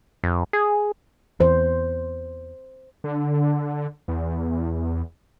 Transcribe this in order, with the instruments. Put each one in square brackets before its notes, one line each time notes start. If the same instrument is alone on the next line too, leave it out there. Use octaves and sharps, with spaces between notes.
[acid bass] F2
G#4
[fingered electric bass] E2 [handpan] C5
[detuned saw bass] D3
E2